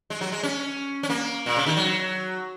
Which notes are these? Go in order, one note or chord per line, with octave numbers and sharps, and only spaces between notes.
G#3
F#3
G#3
C#4
C#4
A#3
A#2
C#3
D#3
F#3